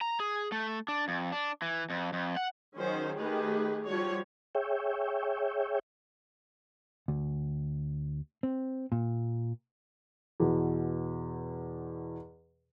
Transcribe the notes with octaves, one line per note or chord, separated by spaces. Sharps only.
A#5
G#4
A3
D4
F2
D4
E3
F2
F2
F#5
D#3 F#3 C#4 G#4 C5
D#3 A3 G4 G#4 B4
F3 G3 F#4 C#5
G#4 C#5 E5 G5
D2
C4
A#2
E2 B2